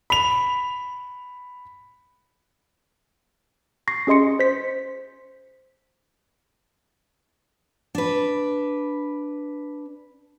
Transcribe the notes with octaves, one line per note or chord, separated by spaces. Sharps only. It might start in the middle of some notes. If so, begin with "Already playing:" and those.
B5 F7
C#6 A#6 C7
C#4 G#4 D#5 C6 C#7
C5 B6
D4 B4